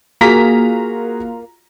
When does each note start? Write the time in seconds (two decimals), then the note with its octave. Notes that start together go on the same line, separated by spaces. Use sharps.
0.21 A#3 F4 F#4 G#4 A#5 B6